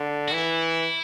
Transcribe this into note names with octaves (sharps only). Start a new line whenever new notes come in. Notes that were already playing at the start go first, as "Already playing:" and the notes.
Already playing: D3
F#4
E3 E4